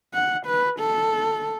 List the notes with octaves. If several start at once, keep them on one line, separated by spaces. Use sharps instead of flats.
F#5
B4
A4